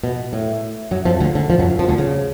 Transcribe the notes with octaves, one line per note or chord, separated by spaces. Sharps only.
B2
A2
F#2 F#3
F2 F3
D2 D3
D2 D3
F2 F3
F#2 F#3
F2 F3
D2 D3
C#3